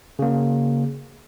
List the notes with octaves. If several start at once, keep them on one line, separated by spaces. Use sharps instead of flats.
C#3 A#3